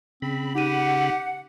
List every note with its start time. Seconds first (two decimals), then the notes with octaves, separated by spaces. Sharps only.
0.22 C#3 C4 B5
0.55 D#4 G4 F#5 D#7